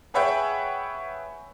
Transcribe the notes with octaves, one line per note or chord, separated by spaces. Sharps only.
G#4 B4 C#5 E5 F#5 G5